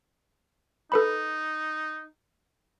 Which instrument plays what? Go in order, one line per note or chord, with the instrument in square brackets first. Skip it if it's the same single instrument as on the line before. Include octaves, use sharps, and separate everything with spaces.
[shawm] D#4 [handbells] A4 B4 B5